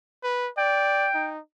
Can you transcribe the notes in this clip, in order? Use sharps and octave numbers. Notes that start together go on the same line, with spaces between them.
B4
D5 G5
D#4